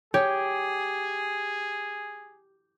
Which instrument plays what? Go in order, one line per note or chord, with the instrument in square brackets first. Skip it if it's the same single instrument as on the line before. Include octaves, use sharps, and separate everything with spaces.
[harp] G4 [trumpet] G#4 [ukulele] C#5